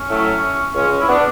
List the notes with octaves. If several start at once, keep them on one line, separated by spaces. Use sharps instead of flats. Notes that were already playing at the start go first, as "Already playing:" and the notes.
Already playing: C#4
A2 F#3 A3
C#2 C#3 G#3 C#4
C#4
E4
B3 D4